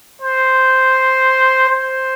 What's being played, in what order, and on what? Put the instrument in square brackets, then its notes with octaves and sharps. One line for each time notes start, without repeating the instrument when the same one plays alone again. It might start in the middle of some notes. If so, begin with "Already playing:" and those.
[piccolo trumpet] C5
C5